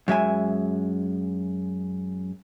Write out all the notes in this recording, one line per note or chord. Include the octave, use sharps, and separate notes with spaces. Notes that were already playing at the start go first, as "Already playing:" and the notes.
F#2 G#3 E5 G#5